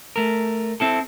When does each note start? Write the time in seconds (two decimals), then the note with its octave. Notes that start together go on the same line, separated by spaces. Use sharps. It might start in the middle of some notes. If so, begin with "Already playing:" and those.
0.16 A3 A#4
0.80 C4 E4 A4